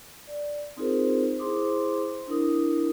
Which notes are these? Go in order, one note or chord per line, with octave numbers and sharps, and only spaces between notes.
D5
C4 D#4 F4 G#4 A#4 C5
E4 G#4 C5 C6 D6 D#6
D4 E4 A#4 D#6